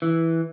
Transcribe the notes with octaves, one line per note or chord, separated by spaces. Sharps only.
E3